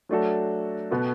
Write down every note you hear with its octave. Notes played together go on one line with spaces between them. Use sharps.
F#3 A3 D4 F#4 A4
B2 B3 F#4 A4